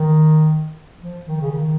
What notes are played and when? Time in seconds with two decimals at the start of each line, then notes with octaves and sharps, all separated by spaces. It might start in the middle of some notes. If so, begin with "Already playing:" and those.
Already playing: D#3
1.01 F3
1.26 D#3
1.41 C#3
1.52 D#3